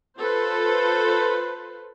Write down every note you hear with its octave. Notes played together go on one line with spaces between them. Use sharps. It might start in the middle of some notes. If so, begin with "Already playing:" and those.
F4 A4 B4 C5